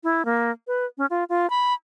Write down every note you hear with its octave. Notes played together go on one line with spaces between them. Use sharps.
E4
A#3
B4
C#4
F4
F4
B5